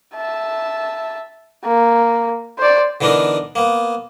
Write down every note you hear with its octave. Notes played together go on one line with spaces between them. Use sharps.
E5 A5
A#3
C5 D5
D3 E3 B3 D4 D#4 A#4
A#3 B3